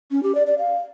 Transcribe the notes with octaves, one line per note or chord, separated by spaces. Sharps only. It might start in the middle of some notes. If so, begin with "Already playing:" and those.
C#4
G4
D5
D5
F5